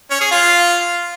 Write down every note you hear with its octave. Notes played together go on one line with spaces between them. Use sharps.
C#4
G#4
F4